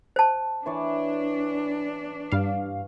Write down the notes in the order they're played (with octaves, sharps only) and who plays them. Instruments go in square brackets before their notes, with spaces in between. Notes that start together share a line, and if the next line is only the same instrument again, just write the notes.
[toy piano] C5 A5
[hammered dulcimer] E3 C#5 D5 [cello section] D4
[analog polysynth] G2 F5